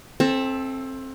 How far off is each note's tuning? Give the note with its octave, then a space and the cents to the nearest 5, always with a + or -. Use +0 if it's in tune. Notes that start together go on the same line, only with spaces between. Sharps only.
C4 +20 A4 -15 E5 +0